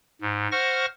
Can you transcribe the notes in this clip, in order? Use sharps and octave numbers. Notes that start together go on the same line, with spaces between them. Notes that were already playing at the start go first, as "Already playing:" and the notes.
G#2
C5 F#5 C#6 F6 A#6